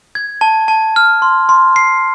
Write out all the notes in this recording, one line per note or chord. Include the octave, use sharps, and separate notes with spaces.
G#6
A5
A5
F6
C6
C6
C7